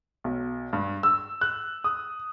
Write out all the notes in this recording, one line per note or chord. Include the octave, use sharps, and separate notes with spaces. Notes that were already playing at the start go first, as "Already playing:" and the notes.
B1
G2
E6
F#6
D#6